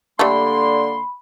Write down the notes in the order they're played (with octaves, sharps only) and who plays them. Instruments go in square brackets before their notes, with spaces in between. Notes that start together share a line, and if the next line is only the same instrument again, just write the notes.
[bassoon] D3 [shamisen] G3 A3 [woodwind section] A#3 D5 C6 [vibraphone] B5